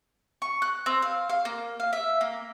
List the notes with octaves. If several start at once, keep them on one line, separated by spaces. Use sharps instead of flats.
C#6
F#6
C4
F5
F5
A#3
F5
E5
A#3